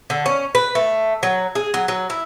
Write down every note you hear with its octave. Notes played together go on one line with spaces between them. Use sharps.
D3
C#4
B4
A3
F#3
G#4
F#3
F#3
E4